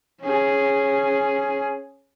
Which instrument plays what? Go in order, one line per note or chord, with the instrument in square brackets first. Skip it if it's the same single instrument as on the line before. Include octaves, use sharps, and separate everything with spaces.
[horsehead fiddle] C#4 G#4